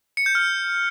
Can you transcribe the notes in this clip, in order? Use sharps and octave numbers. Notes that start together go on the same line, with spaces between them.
C#7
G6
F6